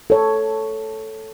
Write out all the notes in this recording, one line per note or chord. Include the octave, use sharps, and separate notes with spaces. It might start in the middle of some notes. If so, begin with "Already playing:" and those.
A4 C#5